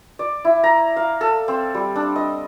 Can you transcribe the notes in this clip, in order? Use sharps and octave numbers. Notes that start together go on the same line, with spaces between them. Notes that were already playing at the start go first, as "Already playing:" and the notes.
D5
E4
A#5
F5
A4
C4
G3
D4
D#5